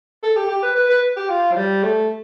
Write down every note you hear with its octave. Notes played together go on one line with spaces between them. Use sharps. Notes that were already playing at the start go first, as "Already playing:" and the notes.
A4
G4
G4
B4
B4
B4
G4
F4
F3
G3
A3